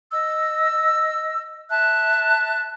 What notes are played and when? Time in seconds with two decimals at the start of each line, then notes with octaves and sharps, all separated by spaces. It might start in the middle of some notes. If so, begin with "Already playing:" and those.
0.12 D#5 E6
1.69 E5 A5 F#6